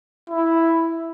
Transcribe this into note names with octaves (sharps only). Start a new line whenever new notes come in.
E4